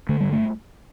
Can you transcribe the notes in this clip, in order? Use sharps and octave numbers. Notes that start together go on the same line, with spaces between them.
D3 A3
G2 G3
A3